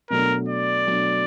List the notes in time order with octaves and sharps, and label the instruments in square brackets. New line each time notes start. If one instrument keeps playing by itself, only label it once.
[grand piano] B2 F#3 A3 D4 [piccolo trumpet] A#4
[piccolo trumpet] D5
[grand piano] B2 F#3 A3 D4